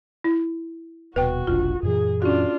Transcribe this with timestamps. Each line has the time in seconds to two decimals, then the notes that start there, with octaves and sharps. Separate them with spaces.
0.24 E4
1.16 D#1 B2 F#4 B4 G5
1.47 F1 B1 D4 F4
1.83 F#2 A#2 E3 G#4
2.22 C#4 D4 F4 F#4